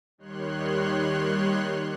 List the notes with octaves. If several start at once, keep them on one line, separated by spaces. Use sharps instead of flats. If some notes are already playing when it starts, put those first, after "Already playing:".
D#2 D#3 G3 C#5 C6 F#6